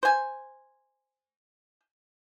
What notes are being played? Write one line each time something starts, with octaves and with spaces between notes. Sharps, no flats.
C5 G#5